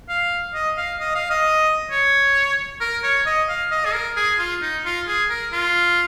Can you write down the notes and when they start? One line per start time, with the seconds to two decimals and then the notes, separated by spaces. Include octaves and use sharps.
0.09 F5
0.54 D#5
0.77 F5
1.00 D#5
1.15 F5
1.30 D#5
1.91 C#5
2.80 A#4
3.03 C#5
3.26 D#5
3.49 F5
3.71 D#5
3.85 G#4
3.94 A#4
4.16 G#4
4.39 F4
4.62 D#4
4.85 F4
5.07 G#4
5.30 A#4
5.53 F4